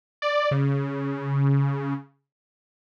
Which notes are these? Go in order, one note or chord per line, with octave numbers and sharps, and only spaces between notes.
D5
C#3